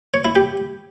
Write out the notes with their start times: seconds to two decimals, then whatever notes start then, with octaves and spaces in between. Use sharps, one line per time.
0.14 C#5
0.25 E4
0.36 G4